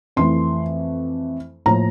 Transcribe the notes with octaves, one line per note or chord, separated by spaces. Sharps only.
F2 E3 A3 C6
A2 F3 A#3 A#5